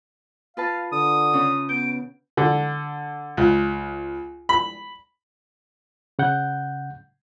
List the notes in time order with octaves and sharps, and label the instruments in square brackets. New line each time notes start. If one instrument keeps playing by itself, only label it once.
[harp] F4 B4 A5 [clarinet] F5
[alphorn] D3 [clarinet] D#6
[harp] C#3 C#4
[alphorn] B3 [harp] G6 [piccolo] D7
[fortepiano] D3
C#2
B5
[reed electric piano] C#3 F#5 G6